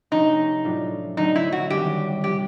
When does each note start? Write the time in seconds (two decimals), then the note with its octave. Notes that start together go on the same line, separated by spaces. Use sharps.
0.11 C3 F3 A3 C#4 D#4
0.64 A2 F#3 A3 D4 F4
1.17 D3 F#3 A3 C4 D#4
1.36 E4
1.52 F#4
1.70 F#1 F#2 D#3 G3 C4 G4
2.24 C3 F3 G4